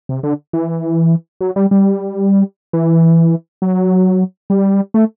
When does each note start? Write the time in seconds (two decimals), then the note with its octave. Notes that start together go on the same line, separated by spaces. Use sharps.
0.09 C3
0.23 D3
0.53 E3
1.41 F#3
1.56 G3
1.71 G3
2.73 E3
3.62 F#3
4.50 G3
4.94 A3